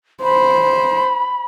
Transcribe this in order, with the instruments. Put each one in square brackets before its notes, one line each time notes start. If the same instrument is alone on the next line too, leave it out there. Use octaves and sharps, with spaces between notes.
[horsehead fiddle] C5 [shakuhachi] B5